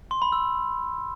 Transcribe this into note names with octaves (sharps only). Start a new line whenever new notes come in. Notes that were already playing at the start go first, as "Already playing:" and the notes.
C6
B5
E6